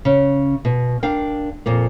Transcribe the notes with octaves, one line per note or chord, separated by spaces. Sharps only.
C#3 C#4
B2
D4 A#4 F5 G5
F2 A#2 A#3